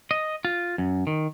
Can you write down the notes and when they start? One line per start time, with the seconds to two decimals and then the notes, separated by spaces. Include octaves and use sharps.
0.11 D#5
0.45 F4
0.78 F#2
1.07 D#3